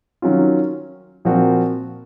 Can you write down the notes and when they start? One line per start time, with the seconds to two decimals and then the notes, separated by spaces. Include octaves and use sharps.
0.22 D#3 F#3 C#4 F4
1.25 A#2 F3 C4 F#4 A#4